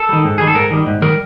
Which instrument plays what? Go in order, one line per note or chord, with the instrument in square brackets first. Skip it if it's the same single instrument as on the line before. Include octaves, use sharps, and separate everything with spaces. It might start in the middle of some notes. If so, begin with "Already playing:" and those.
Already playing: [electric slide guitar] A4
D#3 G3
G#2
D#3 G3 G#4
A4
G#2 A#4
D#3 G3
G#2
D#3 G3 A#4